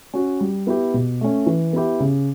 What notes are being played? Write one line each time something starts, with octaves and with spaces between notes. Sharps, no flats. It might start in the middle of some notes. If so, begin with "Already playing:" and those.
C#4 F#4
G3
B3 E4 G4
B2
A3 C#4
E3
B3 E4 G4
C#3